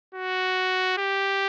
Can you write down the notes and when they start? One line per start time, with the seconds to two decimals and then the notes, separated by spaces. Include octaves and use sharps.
0.14 F#4
0.98 G4